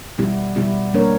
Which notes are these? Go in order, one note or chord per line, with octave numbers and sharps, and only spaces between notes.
B2 G3 B3 E4 G4
B2 G3 B3 E4 G4
G3 A#3 D4 A#4 C#5